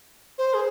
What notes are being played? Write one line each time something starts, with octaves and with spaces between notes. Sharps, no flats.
C5
G#4